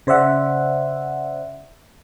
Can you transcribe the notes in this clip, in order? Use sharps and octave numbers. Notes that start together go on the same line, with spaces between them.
C#3 C5 D5 E5 F#5